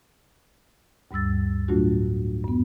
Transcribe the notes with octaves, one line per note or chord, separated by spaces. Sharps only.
D2 G2 G3 E6 A6
A2 F#3 A3 D4 F4 F#4
F#2 B3